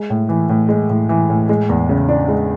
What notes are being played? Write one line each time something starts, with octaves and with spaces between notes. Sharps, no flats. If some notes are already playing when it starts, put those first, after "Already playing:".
Already playing: G#3
A2
E3
A2
G#3
A2
E3
A2
G#3
E2
C#3
D4
G#3